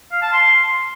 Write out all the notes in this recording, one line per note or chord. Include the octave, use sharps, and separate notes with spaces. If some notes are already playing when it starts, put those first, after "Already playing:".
F5
A5
C6